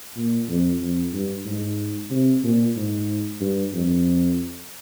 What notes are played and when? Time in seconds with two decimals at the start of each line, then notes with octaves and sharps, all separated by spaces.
0.17 A#2
0.49 F2
0.81 F2
1.13 G2
1.46 G#2
2.11 C3
2.44 A#2
2.76 G#2
3.41 G2
3.74 F2